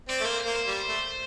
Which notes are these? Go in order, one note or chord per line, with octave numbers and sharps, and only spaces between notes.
C4 D5
A3
A#3 C5
A#3 C5
C5
G3
C5
A3